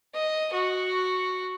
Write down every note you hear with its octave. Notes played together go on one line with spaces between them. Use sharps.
D#5
F#4